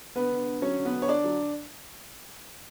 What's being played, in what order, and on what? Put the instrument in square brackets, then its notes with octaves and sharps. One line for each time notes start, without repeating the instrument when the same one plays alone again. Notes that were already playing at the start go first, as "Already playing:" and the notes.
[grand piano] D3 B3 B4
D3
D3
F#3 C#4 C#5
D3
B3 B4
D3
C#5
D3 D4 D5
F#3